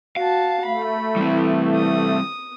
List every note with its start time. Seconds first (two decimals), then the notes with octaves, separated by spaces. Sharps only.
0.16 F#4 F5 A5
0.65 A3 B5
1.16 E3 G3 C4
1.75 D#6